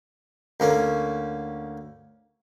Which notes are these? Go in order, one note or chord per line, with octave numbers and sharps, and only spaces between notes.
D2 A#3 C#4